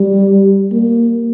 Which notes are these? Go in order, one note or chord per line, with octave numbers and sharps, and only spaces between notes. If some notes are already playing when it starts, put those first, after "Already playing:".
Already playing: G3
A#3